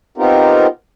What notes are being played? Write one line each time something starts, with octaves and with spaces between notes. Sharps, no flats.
B3 C4 D#4 F4 G4 A#4